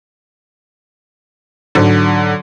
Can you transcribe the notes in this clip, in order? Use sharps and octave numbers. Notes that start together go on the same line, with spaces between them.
G#2 D3 F#3